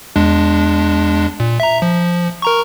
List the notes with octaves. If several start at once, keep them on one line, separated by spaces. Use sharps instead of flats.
E2 G#3 D4
A#2
E5 A#5
F3
A#4 A#5 C#6